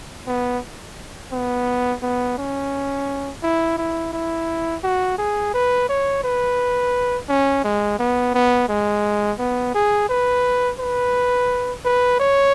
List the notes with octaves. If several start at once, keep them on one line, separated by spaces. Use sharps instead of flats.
B3
B3
B3
C#4
E4
E4
E4
F#4
G#4
B4
C#5
B4
C#4
G#3
B3
B3
G#3
B3
G#4
B4
B4
B4
C#5